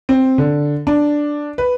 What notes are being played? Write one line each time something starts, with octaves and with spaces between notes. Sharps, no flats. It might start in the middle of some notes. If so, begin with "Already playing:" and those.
C4
D3
D4
B4